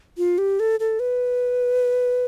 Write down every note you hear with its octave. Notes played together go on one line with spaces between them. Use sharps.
F4
G4
A4
A4
B4